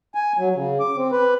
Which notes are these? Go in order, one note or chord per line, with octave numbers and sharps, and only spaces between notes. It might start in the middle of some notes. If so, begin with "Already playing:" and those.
G#5
F#3
C#3
D6
C4
B4